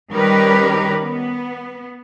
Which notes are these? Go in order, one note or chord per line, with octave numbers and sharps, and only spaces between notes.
D#3 G3 C#4 G4 A#4 B4
B3